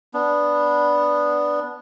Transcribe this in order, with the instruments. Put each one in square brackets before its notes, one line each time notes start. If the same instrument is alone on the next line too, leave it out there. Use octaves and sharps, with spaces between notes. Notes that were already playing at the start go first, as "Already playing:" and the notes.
[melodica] B3 D4